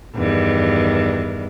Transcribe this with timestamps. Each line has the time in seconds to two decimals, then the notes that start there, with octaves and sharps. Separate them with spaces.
0.15 E2 G2 D#3